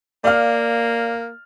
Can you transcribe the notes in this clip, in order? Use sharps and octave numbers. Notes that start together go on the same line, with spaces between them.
A#3 D5 F5 F6